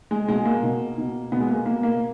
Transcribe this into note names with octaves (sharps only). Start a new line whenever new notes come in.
G#3
B2 G#3
A#3
B2
B2
B2 B3
G#3
A#3
B2 A#3
A#3